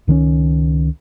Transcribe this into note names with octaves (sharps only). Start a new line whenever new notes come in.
C#2 D#3 F3 C#4